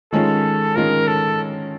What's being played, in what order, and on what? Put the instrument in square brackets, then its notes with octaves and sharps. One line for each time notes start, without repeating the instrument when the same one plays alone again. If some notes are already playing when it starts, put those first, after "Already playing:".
[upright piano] D#3 G#3 C#4 F4 [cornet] A4
[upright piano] D#3 G#3 C#4 F4 [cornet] A#4
[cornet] A4